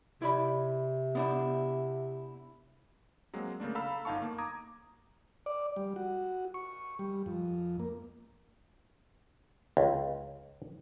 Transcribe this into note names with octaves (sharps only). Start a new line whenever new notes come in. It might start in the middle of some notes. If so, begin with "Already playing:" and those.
C3 E4 D5 B5
B3 D4 E4
F#3 G#3 A#3 C4
C#3 A3 A#3 D4
A4 F5 A#5 B5 E6
G1 D#4 F5 A5 C#6
A#3
A#5 D6 D#6 G#6
D5
G3
F#4
C#6
G3
F2
A#3
C#2